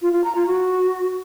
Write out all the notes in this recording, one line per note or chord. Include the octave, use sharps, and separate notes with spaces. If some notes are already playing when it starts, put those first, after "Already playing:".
F4
F4
A#5
F4
F#4